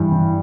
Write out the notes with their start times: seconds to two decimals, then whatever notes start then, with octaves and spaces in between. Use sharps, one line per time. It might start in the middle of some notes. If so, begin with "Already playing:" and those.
Already playing: G2 E3
0.12 E3